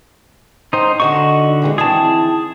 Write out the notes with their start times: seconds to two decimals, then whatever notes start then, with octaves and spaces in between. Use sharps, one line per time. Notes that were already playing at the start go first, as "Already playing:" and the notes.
0.73 G#2 D#3 C#4 D#4 C5
1.00 D3 D#4 F#4 D#5 F#5 C#6
1.62 C3 E3 G#3
1.78 D#3 E3 C4 G#4 A5